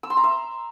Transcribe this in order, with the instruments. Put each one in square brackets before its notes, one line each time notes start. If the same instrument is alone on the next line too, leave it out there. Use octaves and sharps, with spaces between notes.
[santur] E6
C6
A#5
E5